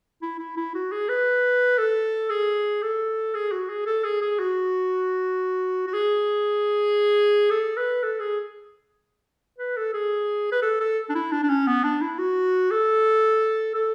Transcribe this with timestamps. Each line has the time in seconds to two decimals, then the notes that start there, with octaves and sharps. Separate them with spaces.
0.22 E4
0.39 E4
0.57 E4
0.75 F#4
0.92 G#4
1.09 B4
1.78 A4
2.30 G#4
2.82 A4
3.35 G#4
3.52 F#4
3.69 G#4
3.86 A4
4.04 G#4
4.22 G#4
4.39 F#4
5.87 F#4
5.94 G#4
7.50 A4
7.77 B4
8.03 A4
8.20 G#4
9.58 B4
9.77 A4
9.94 G#4
10.52 B4
10.62 A4
10.81 A4
11.10 D4
11.15 E4
11.32 D4
11.43 D4
11.49 C#4
11.67 B3
11.84 D4
12.02 E4
12.18 F#4
12.71 A4
13.75 A4